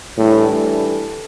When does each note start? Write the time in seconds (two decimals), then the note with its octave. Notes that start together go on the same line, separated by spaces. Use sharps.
0.18 A2 E3 G3 D4 A4